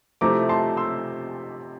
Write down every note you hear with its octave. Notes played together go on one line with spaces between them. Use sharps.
C3 F3 A3 C4 E4 A#5 D6
A5 C6
C6 E6